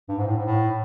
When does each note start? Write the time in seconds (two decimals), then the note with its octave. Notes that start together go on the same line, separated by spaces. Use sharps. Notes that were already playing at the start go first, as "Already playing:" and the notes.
0.09 G2
0.18 G#2
0.27 A2
0.37 G#2
0.46 A2